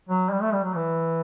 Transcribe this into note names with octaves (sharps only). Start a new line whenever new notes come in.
F#3
G3
A3
G3
F#3
E3